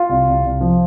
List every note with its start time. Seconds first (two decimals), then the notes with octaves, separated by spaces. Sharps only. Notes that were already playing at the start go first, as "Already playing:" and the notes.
Already playing: F4
0.09 C2
0.27 C2
0.44 C2
0.61 F3